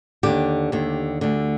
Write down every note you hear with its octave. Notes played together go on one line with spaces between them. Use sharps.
D#2 D3 G4
D#2 D3
D2 D3